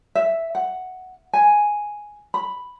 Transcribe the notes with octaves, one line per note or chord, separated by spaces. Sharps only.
E5
F#5
G#5
B5